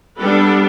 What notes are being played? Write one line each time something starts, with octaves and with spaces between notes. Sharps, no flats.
G3 B3 D4 A4 B4